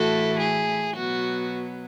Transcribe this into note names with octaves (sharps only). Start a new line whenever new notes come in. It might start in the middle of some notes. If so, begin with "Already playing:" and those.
Already playing: A2 E3 A3 E4 F#4 A4
G#4
B2 F#3 B3 F#4